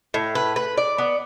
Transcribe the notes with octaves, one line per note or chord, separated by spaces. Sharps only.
A2
B4
B4
D5
B3